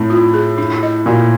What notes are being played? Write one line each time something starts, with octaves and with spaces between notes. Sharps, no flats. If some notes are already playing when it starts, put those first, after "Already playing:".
Already playing: A2 C4
F4
G#4
D4
D#5
A#2 F#4